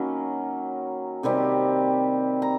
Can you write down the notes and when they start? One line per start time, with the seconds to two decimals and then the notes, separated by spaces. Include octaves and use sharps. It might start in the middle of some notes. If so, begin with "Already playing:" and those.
Already playing: D#3 F#3 A#3 C#4 B5
1.23 C3 D#3 G3 C4
2.42 A#5